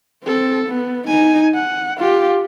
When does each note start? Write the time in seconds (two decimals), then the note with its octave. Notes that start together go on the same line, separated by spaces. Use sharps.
0.24 C4 A4
0.67 B3
1.08 D#4 G#5
1.55 F#5
1.98 F4 G4